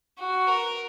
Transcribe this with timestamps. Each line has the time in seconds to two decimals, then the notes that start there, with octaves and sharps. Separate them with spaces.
0.19 F#4
0.47 A#4